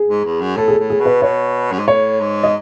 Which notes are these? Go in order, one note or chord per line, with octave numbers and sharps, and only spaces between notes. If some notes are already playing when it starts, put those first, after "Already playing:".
Already playing: G#4
G#2
E2
F#2
A2 A4
G#4
A4
A2
G#4
B2
B4
B2 C#5
F#2
G#2
A2 C#5
G#2
D#5